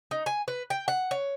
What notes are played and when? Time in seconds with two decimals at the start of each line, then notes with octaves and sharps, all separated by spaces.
0.11 D#4
0.26 G#5
0.48 B4
0.70 G5
0.88 F#5
1.11 C#5